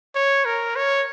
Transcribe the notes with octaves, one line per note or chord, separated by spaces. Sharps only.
C#5
A#4
C#5